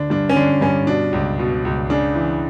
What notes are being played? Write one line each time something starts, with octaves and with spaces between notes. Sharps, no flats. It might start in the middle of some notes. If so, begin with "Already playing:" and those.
Already playing: D2 D3 D4
G2 D4
C#4
D3 D4
G2 C#4
B2 D4
C#2
B2
C#2
C#3 D4
E3